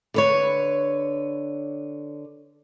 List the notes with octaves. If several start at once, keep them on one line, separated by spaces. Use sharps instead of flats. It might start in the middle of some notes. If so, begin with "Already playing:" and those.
D3 B4 C#5